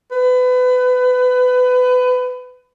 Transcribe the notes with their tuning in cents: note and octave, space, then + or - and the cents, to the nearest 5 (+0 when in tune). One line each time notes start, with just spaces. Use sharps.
B4 +25